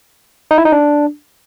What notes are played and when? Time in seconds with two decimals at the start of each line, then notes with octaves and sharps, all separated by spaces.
0.51 D#4
0.58 E4
0.65 D#4
0.72 D4